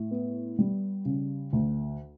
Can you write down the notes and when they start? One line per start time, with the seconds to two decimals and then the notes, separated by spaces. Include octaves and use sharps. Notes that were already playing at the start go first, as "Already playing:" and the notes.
Already playing: A2
0.11 B3
0.59 G3
1.05 C#3
1.53 D2